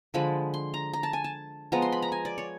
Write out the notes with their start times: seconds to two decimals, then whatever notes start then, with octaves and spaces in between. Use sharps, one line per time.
0.14 D3 F3 G#3 B5
0.54 C6
0.74 A#5
0.93 A#5
1.03 A5
1.13 G#5
1.24 A5
1.72 F3 G#3 B3 A#5
1.82 C6
1.92 B5
2.02 A#5
2.12 G#5
2.25 D5
2.38 C#5